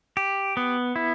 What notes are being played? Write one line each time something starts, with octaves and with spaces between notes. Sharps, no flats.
G4
B3
E4